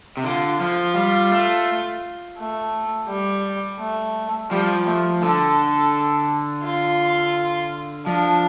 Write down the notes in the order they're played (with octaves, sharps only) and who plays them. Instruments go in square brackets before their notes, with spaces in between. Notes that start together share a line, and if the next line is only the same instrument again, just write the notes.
[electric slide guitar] C3
[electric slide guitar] D3 [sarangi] F4
[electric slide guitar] F3 [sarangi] F4
[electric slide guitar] G3
A3
[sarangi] A3
G3
A3
[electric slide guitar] F3 [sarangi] G3
[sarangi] A3
[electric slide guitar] D3 [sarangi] A4
[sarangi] F4
[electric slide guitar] F3 [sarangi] D4